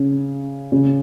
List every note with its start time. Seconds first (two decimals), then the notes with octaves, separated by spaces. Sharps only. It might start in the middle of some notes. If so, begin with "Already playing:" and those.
Already playing: C#3
0.72 C#3